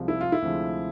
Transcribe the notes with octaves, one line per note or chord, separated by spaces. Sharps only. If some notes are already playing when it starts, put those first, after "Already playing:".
Already playing: C2 C3 F3 G#3
E4
F4
E4
D2 C3 F3 G#3